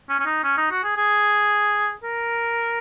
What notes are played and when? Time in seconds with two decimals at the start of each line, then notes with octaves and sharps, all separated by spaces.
0.09 C#4
0.20 C#4
0.26 D#4
0.44 C#4
0.57 D#4
0.71 F#4
0.84 G#4
0.97 G#4
2.03 A#4